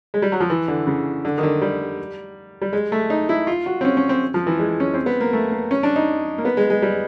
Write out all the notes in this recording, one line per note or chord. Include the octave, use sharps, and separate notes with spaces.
G#3
G3
F#3
F3
E3
D3
C#3
D3
D#3
D3
G3
G3
G#3
A3
D#4
E4
F4
F#4
C4
C#4
C#4
C4
F3
E3
G#3
C#4
C4
B3
A#3
A3
A#3
C#4
D4
D#4
A#3
B3
G#3
G#3
G3